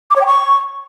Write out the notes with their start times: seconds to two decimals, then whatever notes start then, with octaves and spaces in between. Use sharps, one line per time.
0.10 D6
0.16 C#5
0.21 G5
0.26 C#6